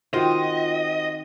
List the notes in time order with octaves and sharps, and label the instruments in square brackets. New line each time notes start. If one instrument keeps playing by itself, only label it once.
[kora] D#3 C4 [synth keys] F4 [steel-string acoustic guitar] F#4 C5 [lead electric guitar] D#5